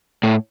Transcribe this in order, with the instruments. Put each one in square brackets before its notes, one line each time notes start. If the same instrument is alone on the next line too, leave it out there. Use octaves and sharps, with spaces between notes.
[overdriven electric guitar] A2